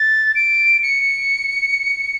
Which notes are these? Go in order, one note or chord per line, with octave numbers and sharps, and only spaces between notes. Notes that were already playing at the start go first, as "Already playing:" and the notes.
Already playing: A6
D7
C#7